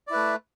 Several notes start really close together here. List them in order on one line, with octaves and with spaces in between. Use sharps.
D5 E4 B4 A3